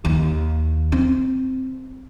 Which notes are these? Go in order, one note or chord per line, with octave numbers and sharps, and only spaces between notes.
D#2
C4